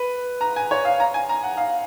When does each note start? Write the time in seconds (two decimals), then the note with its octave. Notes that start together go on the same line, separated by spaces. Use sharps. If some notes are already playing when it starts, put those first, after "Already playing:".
Already playing: B4
0.41 A#5
0.56 G#5
0.71 C#5
0.85 F5
1.00 A#5
1.14 G#5
1.29 A#5
1.44 F#5
1.57 F5